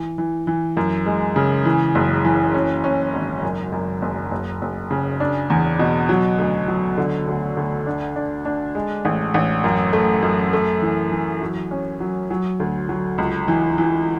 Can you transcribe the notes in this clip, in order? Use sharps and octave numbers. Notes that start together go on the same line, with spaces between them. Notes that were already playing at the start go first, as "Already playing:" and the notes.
Already playing: E3
E3
E3
F#2
G#3
C#3
E3
F#1
E3
C#4
C#4
G#1
F#2
F#2
F#1
F#1
F#1
C#3
D4
E2
B2
F#3
D2
F#3
D3
D2
D2
D4
D4
D4
G#3
A1
A1
F#2
A3
F#2
A3
E3
E3
F#3
C#4
F#3
F#3
D2
F#3
C#2
E3
E3